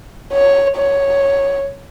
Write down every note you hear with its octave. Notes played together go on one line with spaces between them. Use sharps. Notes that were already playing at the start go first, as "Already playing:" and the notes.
C#5
C#5